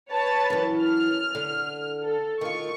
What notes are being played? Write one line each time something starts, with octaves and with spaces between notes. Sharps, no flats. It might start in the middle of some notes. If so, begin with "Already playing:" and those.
B4 C#5 A5
F#2 E3
F6
D3
A4
D#3 F4 C#6